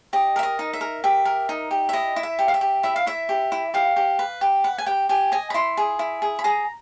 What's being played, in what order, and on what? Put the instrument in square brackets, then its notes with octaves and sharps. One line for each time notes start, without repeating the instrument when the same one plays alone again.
[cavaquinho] G4 D#5
A#4 E5
D#5
D#4
E5
A#4
G4 E5
A#4
D#4
G4
E5
E4 D#5
E4
E5
G4
F5
E5
G4
E4 E5
F5
E4 E5
G4
E4
G4 F5
G4
B4
G4
B4 F#5
G#5
G4 G5
G4 G#5
D#5 G#5
B5
E4 C6
G#4
E4
G#4
B5
G#4 A#5